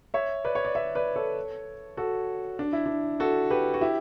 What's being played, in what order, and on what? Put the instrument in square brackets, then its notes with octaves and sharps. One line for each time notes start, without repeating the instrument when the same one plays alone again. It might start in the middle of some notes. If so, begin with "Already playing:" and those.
[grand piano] C#5 E5
B4 D5
C#5
D5
C#5 E5
B4 D5
A4 C#5
F#4 A4
D4
E4
D4
F#4 A4
G4 B4
F#4
E4 G4